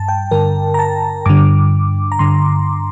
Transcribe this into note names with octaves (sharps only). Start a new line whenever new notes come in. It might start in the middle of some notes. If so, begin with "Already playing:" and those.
Already playing: G2 A5
G5
G2 D3 A#4
A#5
A5
G2 D3 D6
A#5
G2 D3 C6